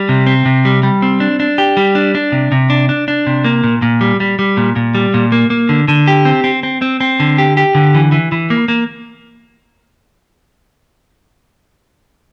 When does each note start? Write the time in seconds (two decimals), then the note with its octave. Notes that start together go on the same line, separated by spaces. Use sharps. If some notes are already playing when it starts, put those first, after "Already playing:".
Already playing: G3
0.09 C3
0.26 C4
0.46 C3
0.65 G3
0.83 G3
1.02 C4
1.20 D4
1.40 D4
1.58 G4
1.77 G3
1.95 D4
2.15 D4
2.32 C3
2.52 C3
2.70 D4
2.89 D4
3.08 D4
3.27 C3
3.44 A#3
3.64 A#2
3.82 A#2
4.01 G3
4.20 G3
4.39 G3
4.57 A#2
4.76 A#2
4.95 G3
5.14 A#2
5.32 A#3
5.50 A#3
5.69 D3
5.88 D3
6.07 G4
6.25 C4
6.44 C4
6.63 C4
6.82 C4
7.00 C4
7.20 D3
7.38 G4
7.57 G4
7.75 D3
7.95 E3
8.12 E3
8.32 E3
8.50 A#3
8.68 A#3